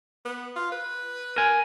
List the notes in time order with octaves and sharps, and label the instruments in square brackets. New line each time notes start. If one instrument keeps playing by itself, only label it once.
[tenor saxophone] B3
F4
B4
[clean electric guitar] A#4 G#5